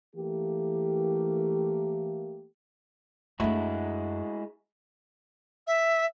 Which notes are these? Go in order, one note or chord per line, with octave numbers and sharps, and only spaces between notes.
E3 A3 A#3 G4
F#2 G#3 A3 D4 E4 F#4
E5